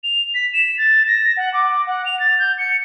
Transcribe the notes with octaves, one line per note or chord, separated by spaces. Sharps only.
F7
B6
E7
A6
A#6
F#5
D6
F#5
F7
A6
G6
C#7